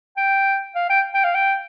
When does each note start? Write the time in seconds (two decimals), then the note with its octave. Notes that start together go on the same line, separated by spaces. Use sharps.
0.17 G5
0.75 F5
0.90 G5
1.14 G5
1.24 F5
1.35 G5